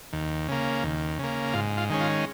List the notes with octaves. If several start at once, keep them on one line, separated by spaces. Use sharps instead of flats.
D#2
C#3 A#3
D#2
C#3 A#3
G#2 F4
F4
D#3 G#3 C#4
F4